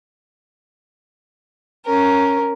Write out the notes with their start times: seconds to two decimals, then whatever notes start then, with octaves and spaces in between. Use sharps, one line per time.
1.86 C#4 A#4